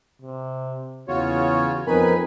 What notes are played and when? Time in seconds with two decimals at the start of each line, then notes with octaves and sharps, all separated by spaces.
0.22 C3
1.08 E2 C#3 F4 F#4 C#5
1.87 F2 B3 C4 D#4 A#4 B4 G#5 B5